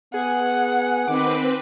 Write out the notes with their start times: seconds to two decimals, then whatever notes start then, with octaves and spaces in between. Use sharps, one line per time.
0.14 B3 G#4 F#5
1.08 D#3 C4 B4 D6